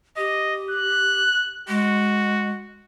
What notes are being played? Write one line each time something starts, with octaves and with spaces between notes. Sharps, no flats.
G4 D#5
F#6
G#3 F#4